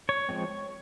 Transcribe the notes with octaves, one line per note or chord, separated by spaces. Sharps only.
C#5
F3 G#3 C4